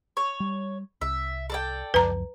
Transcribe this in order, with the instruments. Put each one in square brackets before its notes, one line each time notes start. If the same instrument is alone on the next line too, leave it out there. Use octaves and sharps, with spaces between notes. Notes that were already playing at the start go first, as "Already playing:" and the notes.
[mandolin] C#5
[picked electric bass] G3
[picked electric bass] C2 [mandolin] E5
[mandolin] A4 D5 G5
[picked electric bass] C#2 F#2 F3 [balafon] B4 A#5